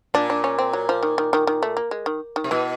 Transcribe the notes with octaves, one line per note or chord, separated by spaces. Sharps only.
A#2 D4
D4
C#4
C4
F#3
F3
D#3
D#3
D#3
D#3
A3
A#3
G#3
D#3
D#3
C3
B2 E3